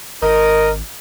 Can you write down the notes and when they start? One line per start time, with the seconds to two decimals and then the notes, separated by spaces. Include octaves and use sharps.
0.22 G#1 A#4 D#5